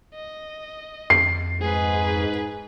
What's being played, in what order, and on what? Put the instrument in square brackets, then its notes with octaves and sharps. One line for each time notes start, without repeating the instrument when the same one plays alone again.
[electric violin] D#5
[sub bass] F2 [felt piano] C7
[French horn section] G#2 [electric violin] G#4 B4